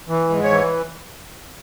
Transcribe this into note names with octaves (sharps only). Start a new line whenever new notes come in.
E3
G#2
C#5
E3